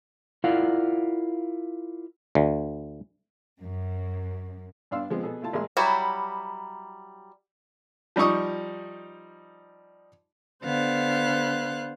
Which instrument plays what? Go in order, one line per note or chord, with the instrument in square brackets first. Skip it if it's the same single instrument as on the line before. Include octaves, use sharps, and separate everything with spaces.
[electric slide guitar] E4 F4 A#4 D5 F5 F#5
[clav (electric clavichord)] D2
[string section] F#2
[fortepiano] G2 B3 D4 F5 C6 E6
F3 G#3 B3 C4
B2 B3 G#4 A4
A3 E4 F4 A5
A1 G#3 A#3 G#4 E5 C6
[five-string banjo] F#3 G3 E4 F#4
[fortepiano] F3 G3 D#4 C#6 D#6
[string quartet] D3 B3 C5 F5 F#6